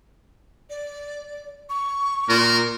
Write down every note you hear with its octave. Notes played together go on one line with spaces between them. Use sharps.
D5
C#6
A#2 A#4